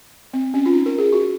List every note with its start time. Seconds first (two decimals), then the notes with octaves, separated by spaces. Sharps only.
0.34 C4
0.54 C#4
0.66 F4
0.73 D#4
0.86 A#4
0.98 G#4
1.13 F#4